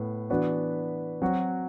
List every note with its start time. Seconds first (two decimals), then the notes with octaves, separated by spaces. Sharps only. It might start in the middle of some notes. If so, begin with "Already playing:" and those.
Already playing: A2 B3
0.30 E3 B3 D4 F#4 B4
1.22 F#3 C4 F#4